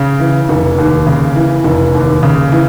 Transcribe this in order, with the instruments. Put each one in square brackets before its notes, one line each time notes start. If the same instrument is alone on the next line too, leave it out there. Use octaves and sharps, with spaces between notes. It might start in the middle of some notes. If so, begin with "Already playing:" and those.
Already playing: [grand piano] C#3
E3
F1
D#2
C#3
E3
F1
D#2
C#3
E3